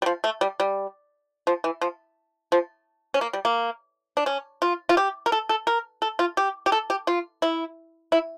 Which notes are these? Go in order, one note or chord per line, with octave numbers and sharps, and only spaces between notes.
G3
F3
A3
G3
G3
F3
E3
F3
F3
C#4
A#3
G3
A#3
D4
C#4
F4
F4
G4
A#4
A4
A4
A#4
A4
F4
G4
G4
A4
G4
F4
E4
E4